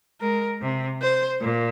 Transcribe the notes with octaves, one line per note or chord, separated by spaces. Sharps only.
G#3 A#4
C3
C5
A#2